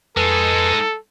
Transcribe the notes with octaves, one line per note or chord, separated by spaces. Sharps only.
F2 G#3 D#4 A4 B4 G#5